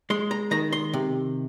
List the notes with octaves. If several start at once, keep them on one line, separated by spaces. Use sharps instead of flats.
G#3 C6
A#5
D#3 A#5
C6
C3